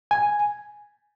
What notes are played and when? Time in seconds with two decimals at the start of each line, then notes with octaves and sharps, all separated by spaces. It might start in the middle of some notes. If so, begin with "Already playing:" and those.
0.11 G#5